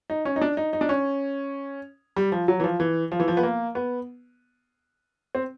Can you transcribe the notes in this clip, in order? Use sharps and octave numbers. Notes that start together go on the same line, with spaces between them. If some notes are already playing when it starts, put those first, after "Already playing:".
D#4
C#4
D#4
D4
D#4
D#4
D4
C#4
G3
F3
F#3
E3
F3
E3
F3
E3
F3
B3
A#3
B3
C4